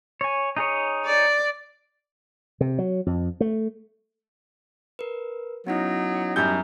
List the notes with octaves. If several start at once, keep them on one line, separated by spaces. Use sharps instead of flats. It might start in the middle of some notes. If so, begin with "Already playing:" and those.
C#5 G#5
D#4 G#4 C#5
D5
C3
F#3
F2
A3
A#4 B4
F#3 B3 C#4 D#4 E4
F#2 G3 G6